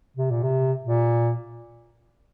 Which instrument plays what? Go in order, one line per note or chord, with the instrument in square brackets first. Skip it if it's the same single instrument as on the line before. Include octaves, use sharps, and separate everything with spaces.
[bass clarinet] C3
A#2
C3
A#2